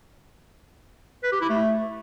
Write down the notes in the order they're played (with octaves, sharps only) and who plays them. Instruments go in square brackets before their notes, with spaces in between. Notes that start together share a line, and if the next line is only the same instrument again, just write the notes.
[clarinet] B4
G4
E4
A3